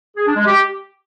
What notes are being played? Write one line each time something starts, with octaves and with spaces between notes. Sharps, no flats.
G#4
D4
G#3
G4